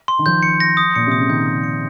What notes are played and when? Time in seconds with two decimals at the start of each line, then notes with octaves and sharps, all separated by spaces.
0.08 C6
0.19 D#3
0.26 F3 G6
0.43 C#7
0.60 A#6
0.77 D#6
0.95 A#2 C#7
1.07 C3 D#6
1.19 C#3
1.29 D#3 G6
1.47 D#6
1.64 C#7